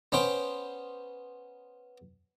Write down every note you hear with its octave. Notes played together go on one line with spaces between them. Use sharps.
B3 C#4 C5 G5